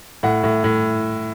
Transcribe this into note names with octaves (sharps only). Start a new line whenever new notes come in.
A2 F#5
A2
A2